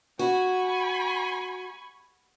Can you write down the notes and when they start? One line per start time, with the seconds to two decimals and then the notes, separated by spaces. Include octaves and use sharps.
0.19 F#4 G#5 B5 C#6